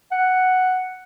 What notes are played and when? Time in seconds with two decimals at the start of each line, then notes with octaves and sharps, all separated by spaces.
0.12 F#5